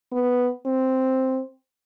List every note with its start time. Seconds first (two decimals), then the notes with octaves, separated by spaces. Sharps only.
0.12 B3
0.66 C4